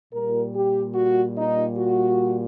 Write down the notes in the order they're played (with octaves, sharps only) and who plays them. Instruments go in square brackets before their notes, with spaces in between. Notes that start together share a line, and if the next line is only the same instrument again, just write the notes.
[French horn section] A#2 G3 A#4
G4
F#4
D#4
F#4